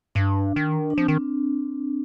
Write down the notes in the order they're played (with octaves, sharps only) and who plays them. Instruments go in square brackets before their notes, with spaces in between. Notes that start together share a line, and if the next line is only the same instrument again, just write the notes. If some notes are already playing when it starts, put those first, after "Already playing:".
[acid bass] G2 [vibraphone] D4
[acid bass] D#3
[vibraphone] D4
[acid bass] F3 [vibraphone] C4
[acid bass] D#3